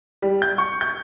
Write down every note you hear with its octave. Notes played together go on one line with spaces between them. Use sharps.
G3
G6
C#6
G6